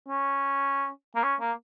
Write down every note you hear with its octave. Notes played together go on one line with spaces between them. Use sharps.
C#4
A#3
C#4
A#3